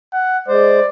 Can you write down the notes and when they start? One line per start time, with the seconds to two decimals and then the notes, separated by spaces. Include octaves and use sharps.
0.14 F#5
0.48 G#3 C5 D5